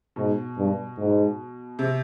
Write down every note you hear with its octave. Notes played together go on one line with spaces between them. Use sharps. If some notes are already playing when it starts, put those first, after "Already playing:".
G#2 B2
G2
G#2
C3